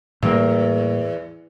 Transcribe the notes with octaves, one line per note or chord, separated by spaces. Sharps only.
E2 A2 G3 A#3